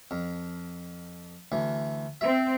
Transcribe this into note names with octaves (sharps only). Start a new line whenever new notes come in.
F2
D2 E3
C4 E5